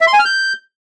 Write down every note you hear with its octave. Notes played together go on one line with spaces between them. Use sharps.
E5
C6
G#5
F6
G6